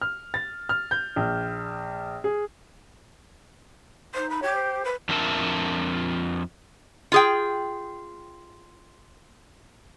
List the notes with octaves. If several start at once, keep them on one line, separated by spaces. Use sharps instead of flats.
F6
A6
F6
G6
A#1
G#4
D#4 C5
B5
G4 C#5
C5
B4
F2 D4 F4 A#4 E5 A5
F4 G#4 G5